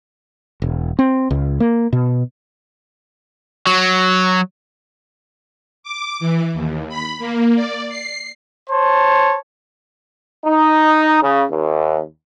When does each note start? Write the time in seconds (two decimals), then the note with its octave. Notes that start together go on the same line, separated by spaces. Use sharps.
0.62 E1
0.99 C4
1.31 C#2
1.60 A#3
1.93 B2
3.67 F#3
5.83 D6
6.20 E3
6.53 D#2
6.89 B5
7.19 A#3
7.55 D5
7.89 C7
8.70 C5 C#5 A5
10.45 D#4
11.21 C#3
11.50 D#2